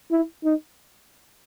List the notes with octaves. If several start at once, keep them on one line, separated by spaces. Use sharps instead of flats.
E4
D#4